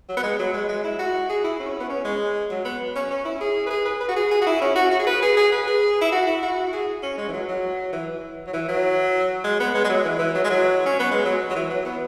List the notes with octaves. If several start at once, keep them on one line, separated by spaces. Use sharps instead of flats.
F#3
B3
G#3
F#3
G#3
G#3
E4
F#4
G#4
E4
C#4
B3
C#4
G#3
F#3
B3
C#4
C#4
E4
G#4
B4
G#4
B4
B4
F#4
G#4
G#4
F#4
E4
C#4
F#4
F#4
G#4
B4
G#4
G#4
B4
G#4
E4
F#4
E4
F#4
G#4
C#4
G#3
E3
F#3
F#3
E3
F#3
E3
F#3
G#3
B3
G#3
G#3
F#3
E3
E3
F#3
G#3
F#3
C#4
B3
G#3
F#3
F#3
E3
F#3
B3